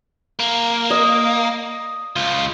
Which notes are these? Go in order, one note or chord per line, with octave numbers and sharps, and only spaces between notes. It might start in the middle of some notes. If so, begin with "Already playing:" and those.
A#3
D#5
C#2 F4